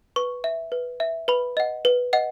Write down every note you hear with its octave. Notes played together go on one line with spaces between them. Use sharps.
B4 C#6
E5
B4
E5
B4 B5
D#5 F#5
B4
D#5 F#5